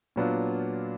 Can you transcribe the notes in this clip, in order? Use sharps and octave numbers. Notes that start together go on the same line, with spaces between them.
A#2 F#3 B3 D4 F4